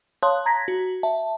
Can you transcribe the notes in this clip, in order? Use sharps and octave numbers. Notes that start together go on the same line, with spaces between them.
C#5 F5 A5 C6 D#6 F#6
A#5 G#6 A#6 B6
F#4
E5 A5